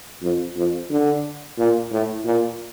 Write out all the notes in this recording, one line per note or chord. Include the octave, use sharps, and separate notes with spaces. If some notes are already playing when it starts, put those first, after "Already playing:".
F2
F2
D3
A#2
A2
A#2